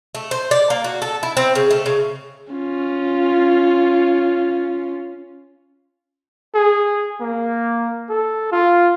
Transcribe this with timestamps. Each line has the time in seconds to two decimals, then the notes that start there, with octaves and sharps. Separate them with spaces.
0.15 A3
0.31 C5
0.51 D5
0.70 A#3
0.84 F#4
1.02 A4
1.23 E4
1.37 C4
1.55 C#3
1.71 A3
1.86 C#3
2.53 C#4 F4
6.55 G#4
7.21 A#3
8.09 A4
8.52 F4